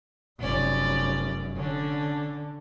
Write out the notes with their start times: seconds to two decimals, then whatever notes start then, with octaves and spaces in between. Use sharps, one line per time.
0.39 F1 F#2 C#4 D5
1.56 D3 C#4 D4